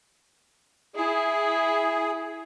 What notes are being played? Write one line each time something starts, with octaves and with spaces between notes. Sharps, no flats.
E4 G#4